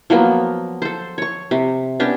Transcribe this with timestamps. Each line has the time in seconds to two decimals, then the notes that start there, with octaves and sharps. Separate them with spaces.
0.10 F3 F#3 A#3 B3
0.82 A4 C5
1.18 C#5 C#6
1.51 C3
2.00 B3 C#4 D4 G4